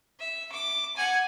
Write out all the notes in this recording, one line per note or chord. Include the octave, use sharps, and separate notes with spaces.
E5
D6
F#5 G#5